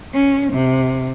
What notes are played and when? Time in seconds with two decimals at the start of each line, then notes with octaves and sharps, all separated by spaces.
0.14 C#4
0.53 C3